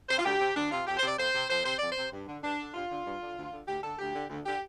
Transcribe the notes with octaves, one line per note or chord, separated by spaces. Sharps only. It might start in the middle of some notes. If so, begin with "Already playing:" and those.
C3 C5
F4
D2 G4
C3
D2 D4
C3 F4
F2 G4
C5
C3 D5
F2 C5
C3
F2 C5
C3 C5
F2 D5
C3 C5
G2
D3
G2 D4
D3
G2 F4
D3
G2
D3
D2
D3
D2 G4
D3 A4
D2 G4
D3
D2
D3 G4